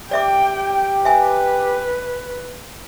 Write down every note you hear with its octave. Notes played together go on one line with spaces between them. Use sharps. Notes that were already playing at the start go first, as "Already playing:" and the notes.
G4 D5 E5 G5 D6
B4 E5 G#5